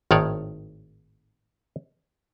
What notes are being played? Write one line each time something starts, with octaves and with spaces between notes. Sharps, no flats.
G#1 A2 D#3 C#5 D5